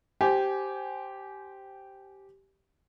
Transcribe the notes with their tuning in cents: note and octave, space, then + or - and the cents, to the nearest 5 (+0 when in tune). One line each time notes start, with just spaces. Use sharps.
G4 -10 C5 +0 G#5 +15